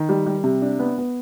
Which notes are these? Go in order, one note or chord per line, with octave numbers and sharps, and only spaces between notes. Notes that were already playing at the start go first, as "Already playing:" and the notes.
Already playing: D#3
G3
G3
C3
D4
B3
B3